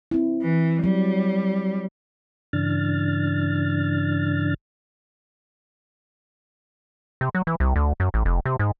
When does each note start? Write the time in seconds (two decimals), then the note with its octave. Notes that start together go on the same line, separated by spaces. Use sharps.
0.11 C4 E4
0.42 E3
0.84 F#3 G3
2.53 G2 C#3 E3 D4 F6 A6
7.21 C3
7.35 F#3
7.47 E3
7.60 C2
7.76 D2
8.00 F#2
8.14 A1
8.25 F1
8.46 C3
8.59 G#2